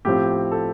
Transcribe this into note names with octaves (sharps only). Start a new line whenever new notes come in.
A2 F3 C4 G4
A4